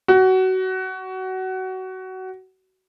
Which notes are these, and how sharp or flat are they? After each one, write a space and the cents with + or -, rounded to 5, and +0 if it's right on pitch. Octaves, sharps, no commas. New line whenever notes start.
F#4 +20